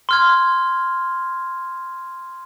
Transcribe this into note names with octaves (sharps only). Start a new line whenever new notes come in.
C6 F6 G#6